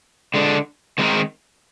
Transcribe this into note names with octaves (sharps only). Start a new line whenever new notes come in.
D3 G#3 D4
D#3 G#3 C4 D#4 A#4